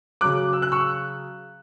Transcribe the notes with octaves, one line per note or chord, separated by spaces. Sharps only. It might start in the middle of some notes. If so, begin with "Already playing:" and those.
C#3 F#3 D6 F#6
E6
F#6
C#6 E6